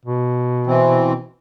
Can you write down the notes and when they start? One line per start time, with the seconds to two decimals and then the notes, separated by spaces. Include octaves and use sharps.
0.05 B2
0.67 E3 C4